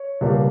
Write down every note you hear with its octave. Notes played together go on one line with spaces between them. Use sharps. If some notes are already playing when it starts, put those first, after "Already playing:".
Already playing: C#5
C#2 B2 G3 A#3